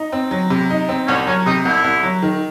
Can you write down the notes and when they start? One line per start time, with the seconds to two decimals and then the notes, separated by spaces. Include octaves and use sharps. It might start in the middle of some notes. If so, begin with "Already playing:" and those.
Already playing: D#4
0.12 C4
0.31 F#3
0.50 C3
0.70 D#4
0.89 C4
1.07 C2 C#4
1.27 F#3 C#4
1.46 C3 D#4
1.65 C2 E4
1.84 C2
2.03 F#3
2.23 D#3